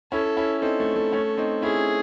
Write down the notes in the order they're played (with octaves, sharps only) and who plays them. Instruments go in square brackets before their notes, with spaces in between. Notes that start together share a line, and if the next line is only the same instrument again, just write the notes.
[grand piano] C#4 E4 [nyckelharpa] A4
[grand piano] C#4 E4
[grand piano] C4 D#4 [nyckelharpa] A4
[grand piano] A3
A3
A3 C#4
C4 D#4
[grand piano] C#4 E4 [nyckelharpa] G#4